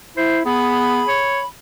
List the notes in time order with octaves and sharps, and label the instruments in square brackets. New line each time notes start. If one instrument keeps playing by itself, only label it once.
[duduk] E4 [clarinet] C5
[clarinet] B3 [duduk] G#4 [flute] B5
[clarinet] C#5